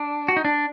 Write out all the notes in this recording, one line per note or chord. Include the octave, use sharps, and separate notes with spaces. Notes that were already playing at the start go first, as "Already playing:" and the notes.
Already playing: D4
F#4
D#4
D4